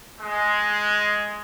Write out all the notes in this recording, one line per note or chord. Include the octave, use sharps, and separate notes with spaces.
G#3